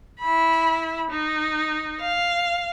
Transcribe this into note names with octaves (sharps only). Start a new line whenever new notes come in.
E4 B5
D#4
F5